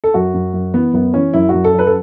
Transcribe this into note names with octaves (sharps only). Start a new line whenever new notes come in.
A4
F#2 F#4
F#2
F#2
E3 B3
F#2 B3
E3 C#4
F#2 E4
F#4
F#2
A4
F#3 B4
A4